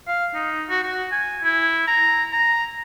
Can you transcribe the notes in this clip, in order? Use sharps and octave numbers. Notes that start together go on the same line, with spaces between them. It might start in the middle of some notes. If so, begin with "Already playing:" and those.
F5
D#4
F#4
F#4
G#5
E4
A#5
A#5